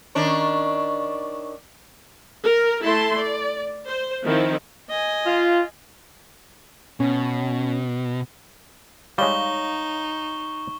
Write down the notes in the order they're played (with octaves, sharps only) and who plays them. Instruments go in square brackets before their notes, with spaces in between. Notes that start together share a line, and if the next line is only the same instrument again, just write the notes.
[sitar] D#3 D4 C#5
[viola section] A#4
A3 E4 A5 C6
D5
C5
D#3 F3 C4 E4
[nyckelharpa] D#5 G#5
[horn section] F4
[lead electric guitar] B2 [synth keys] C#4
[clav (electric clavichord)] G3 G#3 [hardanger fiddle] D#4 [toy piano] C#5 F5 [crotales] C#6 G7